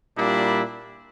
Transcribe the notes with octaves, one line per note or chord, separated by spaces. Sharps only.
A#2 G3 D4 E4